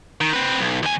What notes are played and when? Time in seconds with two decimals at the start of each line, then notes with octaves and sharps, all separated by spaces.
0.21 D#3
0.33 C4 B4
0.60 B1
0.83 D#2 G#5